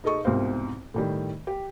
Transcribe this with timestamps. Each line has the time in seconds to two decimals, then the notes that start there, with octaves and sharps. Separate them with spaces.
0.04 D#4 G#4 A4 D#5 C#6
0.24 C2 G#2 B2 C4 C5 F5
0.94 A2 D#3 G3
1.47 G4